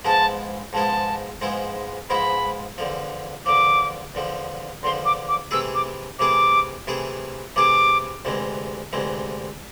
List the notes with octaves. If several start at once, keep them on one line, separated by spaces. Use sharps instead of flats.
G#2 F3 G#3 B3 E4 A5
G#2 F3 G#3 B3 E4 A5
G#2 F3 G#3 B3 E4
G#2 F3 G#3 B3 E4 B5
E2 D3 F3
E2 D3 F3 D6
E2 D3 F3
E2 D3 F3 C6
D6
D6
C3 E3 A3 E4 G#4 E6
D6
C3 E3 A3 E4 G#4 D6
C3 E3 A3 E4 G#4
C3 E3 A3 E4 G#4 D6
D2 C3 E3 G#3
D2 C3 E3 G#3